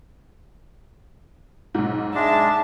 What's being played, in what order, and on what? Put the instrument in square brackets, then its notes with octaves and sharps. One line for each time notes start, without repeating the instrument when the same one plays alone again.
[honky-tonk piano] B1 G#2
[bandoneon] G#3 D4 [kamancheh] E5 A5